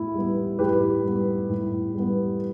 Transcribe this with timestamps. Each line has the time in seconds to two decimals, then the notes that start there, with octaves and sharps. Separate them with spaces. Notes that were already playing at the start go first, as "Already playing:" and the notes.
Already playing: A2 B3 E4
0.14 G3 B3
0.59 A2 G4 B4
1.04 G3 B3
1.50 A2
1.95 G3 B3